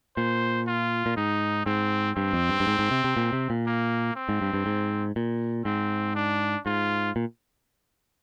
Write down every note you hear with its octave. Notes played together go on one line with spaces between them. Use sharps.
A#2 C5
F4
A#2
G#2 D#4
G#2 C4
G2 C4
F2
G2
G2
G#2
G#2
C3
C3
A#2
C3
A#2
A#3
C4
G#2
G2
G2
G#2
A#2
G#2 C4
D4
G#2 F4
A#2